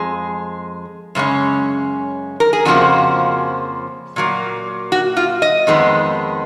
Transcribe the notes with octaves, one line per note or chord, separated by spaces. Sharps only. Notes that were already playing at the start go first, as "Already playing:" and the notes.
Already playing: F2 G#3 G#4
F#2 C#3 G#3 C#4
A#4
G#4
F2 C#3 F3 A#3 F#4
A#2 F#3 A#3
F#4
F4
D#5
F2 D#3 G#3 B3